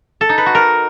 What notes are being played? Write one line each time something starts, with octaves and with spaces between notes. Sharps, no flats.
A4
D#4
B4
F#4
A#4